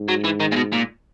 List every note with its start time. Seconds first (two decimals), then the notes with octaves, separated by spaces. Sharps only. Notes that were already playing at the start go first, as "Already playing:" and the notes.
Already playing: G#2
0.08 F#3
0.24 E3
0.40 D#3
0.52 A#2
0.56 B2
0.72 A#2